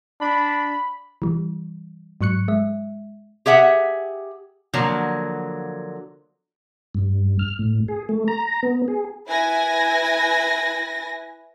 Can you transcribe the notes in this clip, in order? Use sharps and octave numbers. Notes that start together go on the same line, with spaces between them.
D4 B5
E3 G3
G#2 F#3 C#6 F#6 C#7
G#3 E5
G4 G#4 E5 F#5
D3 F3 F#3 A#3
G2
F6
A2
G#4
A3
A#5
B3
G#4
E4 B4 G#5 A#6